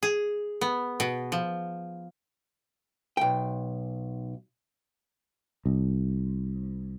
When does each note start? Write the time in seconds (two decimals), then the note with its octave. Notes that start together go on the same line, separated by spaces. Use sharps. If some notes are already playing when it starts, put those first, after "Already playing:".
0.03 G#4
0.61 B3
1.00 B2
1.32 F3
3.17 B1 G5
5.66 C2